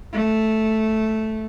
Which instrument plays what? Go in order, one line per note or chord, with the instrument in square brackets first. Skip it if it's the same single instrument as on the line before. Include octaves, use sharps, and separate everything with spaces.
[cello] A3